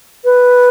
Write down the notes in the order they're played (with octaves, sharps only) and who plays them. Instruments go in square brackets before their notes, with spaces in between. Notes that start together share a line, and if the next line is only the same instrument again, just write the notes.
[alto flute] B4